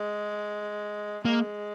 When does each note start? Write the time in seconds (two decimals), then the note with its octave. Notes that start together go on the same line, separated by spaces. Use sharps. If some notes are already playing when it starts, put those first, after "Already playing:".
Already playing: G#3
1.25 G#3 A#3